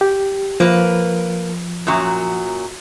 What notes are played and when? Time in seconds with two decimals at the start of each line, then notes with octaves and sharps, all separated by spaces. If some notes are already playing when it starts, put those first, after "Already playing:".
0.01 G4
0.60 F3 A#3 B4
1.87 F#2 A#2 F#3